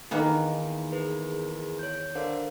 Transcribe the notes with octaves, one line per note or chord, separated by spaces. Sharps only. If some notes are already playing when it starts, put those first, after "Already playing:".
E2 D#3 A#3 B3 G#5
G#4 A#4 B4
C#5 G6
D3 A#4 C5 F5